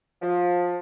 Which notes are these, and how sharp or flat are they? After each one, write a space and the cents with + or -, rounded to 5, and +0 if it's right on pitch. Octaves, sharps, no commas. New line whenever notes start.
F3 +20